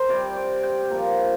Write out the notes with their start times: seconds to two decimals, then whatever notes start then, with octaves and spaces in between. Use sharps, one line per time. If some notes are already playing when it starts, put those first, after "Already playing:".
Already playing: A#4 C5
0.09 C3 G3 D5
0.36 D5
0.63 G5
0.90 A#2 F3 A#5